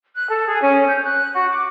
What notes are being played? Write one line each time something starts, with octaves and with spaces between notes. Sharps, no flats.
F#6
A4
G#4
C#4
G6
F#6
F#4
D6